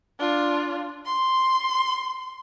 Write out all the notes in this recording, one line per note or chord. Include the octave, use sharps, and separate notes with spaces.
D4 F4
C6